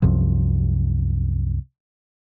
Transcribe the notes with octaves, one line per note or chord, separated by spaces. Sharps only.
C2 F#2 C3 F3